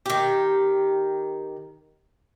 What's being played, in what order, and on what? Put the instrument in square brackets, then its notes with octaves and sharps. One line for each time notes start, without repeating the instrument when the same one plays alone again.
[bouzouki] D#3 G4